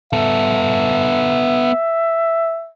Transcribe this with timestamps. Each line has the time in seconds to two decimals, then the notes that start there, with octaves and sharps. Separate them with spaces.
0.13 B3 A4 E5